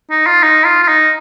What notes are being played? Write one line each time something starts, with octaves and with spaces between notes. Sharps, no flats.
D#4
F4
D#4
F4
F4
D#4